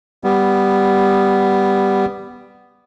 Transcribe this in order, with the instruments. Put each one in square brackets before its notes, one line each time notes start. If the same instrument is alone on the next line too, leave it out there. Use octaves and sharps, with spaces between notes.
[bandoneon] G3 B3